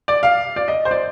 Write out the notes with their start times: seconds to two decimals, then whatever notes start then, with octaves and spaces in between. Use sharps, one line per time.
0.08 D5
0.23 F5
0.56 D5
0.68 D#5
0.85 C5
0.91 D5